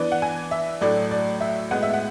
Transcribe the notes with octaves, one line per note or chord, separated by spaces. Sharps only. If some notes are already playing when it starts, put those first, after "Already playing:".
Already playing: E3 B3 D4
F#5
G#5
E5
A2 F#3 A3 D4 D5
D5
E5
A2 G#3 B3 F#5
E5
F#5